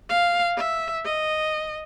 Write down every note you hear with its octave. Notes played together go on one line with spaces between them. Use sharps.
F5
E5
D#5